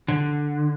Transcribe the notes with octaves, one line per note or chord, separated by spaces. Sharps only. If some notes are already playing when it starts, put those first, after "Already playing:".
D3